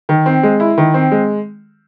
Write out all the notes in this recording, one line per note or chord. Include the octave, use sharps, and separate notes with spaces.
D#3
C4
G#3
E4
D#3
C4
G#3